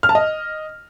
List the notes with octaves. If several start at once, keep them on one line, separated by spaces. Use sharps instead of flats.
F6
A5
D#5